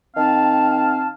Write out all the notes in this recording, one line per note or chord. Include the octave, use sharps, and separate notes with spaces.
D#3 C4 F5 A5